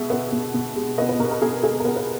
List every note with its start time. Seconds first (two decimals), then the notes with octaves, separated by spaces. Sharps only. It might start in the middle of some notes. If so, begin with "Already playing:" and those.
Already playing: B2 G#3 E5
0.10 B3
0.32 B2
0.54 B2
0.76 G#3
0.98 B3 D#5
1.09 B4
1.20 B2 A#4
1.31 A#4
1.42 B2 G#4
1.63 G#3 G#4
1.80 A#4
1.85 B3
1.96 B4